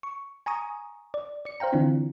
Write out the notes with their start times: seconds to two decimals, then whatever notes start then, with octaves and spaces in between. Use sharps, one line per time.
0.03 C#6
0.46 G#5 A#5 C#6 D#6
1.14 D5
1.45 D5 C#7
1.60 C5 F5 G5 A#5
1.73 D3 E3 C4 D4 E4 F4